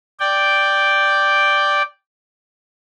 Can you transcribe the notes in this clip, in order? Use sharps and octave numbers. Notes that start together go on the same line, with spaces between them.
D5 G5